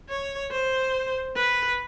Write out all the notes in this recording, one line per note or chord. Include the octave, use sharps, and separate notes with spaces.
C#5
C5
B4